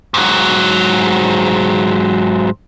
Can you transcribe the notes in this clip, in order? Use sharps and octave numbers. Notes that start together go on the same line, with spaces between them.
G#2 F#3